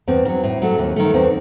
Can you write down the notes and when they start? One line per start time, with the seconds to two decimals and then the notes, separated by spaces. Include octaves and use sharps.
0.08 E2 C4
0.25 D#3
0.28 F#3
0.44 A2
0.62 F#3 A3
0.78 D#2
0.96 D#3 F#3 A3
1.14 E2 C4